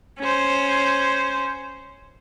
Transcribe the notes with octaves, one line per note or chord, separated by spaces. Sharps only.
C#4 C5